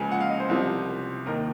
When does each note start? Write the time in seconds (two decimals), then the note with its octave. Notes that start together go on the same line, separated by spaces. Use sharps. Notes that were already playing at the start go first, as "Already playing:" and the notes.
Already playing: C#2 C#3 F3 G#5
0.11 F#5
0.20 F5
0.30 D#5
0.40 C5
0.49 C2 C3 F3
1.26 D#2 D#3 A#4